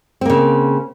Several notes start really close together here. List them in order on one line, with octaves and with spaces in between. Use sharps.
C4 A#3 C#3